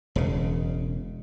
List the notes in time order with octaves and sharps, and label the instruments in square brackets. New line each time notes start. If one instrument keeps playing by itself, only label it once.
[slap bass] E1 C#3